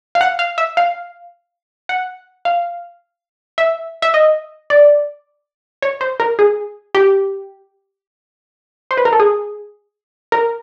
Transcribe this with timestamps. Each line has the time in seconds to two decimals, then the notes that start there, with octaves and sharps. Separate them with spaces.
0.15 F5
0.21 F#5
0.39 F5
0.58 E5
0.77 F5
1.89 F#5
2.45 F5
3.58 E5
4.02 E5
4.14 D#5
4.70 D5
5.82 C#5
6.01 C5
6.20 A#4
6.39 G#4
6.95 G4
8.91 C5
8.97 B4
9.05 A#4
9.13 A4
9.20 G#4
10.32 A#4